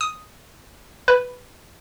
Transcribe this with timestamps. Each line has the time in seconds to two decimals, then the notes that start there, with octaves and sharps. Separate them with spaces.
0.01 D#6
1.08 B4